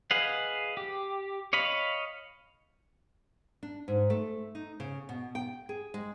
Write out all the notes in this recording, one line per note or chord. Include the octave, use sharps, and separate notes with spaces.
G#4 B4 D#5 F5 F#5
G4
C#5 D#5 F5 B5
D4
G#2
A3
D#4
C#3
B2
G5
G#4
G#3